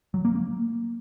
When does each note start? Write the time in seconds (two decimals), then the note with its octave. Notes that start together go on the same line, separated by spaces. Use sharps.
0.14 F#3
0.25 A#3
0.35 A#3